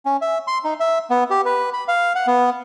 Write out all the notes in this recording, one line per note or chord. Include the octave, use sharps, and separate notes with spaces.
C#4
E5
C6
D#4
E5
B3
G4
B4
B5
F5
F#5
B3